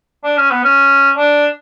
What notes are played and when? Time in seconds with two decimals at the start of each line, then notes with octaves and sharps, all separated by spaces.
0.24 D4
0.37 C#4
0.51 B3
0.64 C#4
1.17 D4